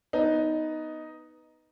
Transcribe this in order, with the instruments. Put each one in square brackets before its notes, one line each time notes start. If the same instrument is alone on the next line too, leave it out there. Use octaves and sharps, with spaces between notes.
[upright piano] B3 D#4